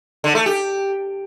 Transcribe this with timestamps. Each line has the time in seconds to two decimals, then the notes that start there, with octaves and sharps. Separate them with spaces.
0.24 D3
0.35 A3
0.46 G4